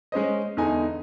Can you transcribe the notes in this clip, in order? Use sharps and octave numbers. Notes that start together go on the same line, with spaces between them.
G#3 C#4 C5 D#5
E2 D3 D#4 G#5